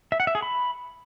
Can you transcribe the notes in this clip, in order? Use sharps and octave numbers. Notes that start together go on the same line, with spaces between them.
E5
F#5
E5
G#4
B5